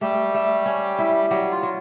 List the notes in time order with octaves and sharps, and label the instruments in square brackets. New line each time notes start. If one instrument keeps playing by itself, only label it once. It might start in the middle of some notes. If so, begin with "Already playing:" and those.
[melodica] G3 G4 [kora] A3
[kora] A3
C#4
E4
[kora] F#3 [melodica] G3 G4
[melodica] F4
[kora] F#3